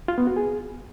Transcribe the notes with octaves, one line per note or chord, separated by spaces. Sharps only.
F4
B3
F#4
G#4